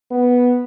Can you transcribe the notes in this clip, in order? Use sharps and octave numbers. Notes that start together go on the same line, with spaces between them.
B3